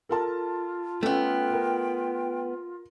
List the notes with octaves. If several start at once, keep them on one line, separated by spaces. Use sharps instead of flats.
F4 A4 A#4 A5
A3 B3 C#4 A4 G5
A#4